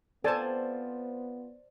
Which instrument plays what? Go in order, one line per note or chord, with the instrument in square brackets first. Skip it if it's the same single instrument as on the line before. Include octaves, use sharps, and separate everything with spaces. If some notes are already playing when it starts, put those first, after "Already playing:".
[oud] F3 C4 [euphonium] B3 [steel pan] A4 G#5 A5 [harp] C5 D5